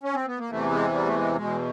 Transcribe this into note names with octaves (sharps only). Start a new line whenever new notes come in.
C#4
C4
B3
A#3
E2 C3 E3 A3
G#3
G3
A3
G#3
E2 B2 G#3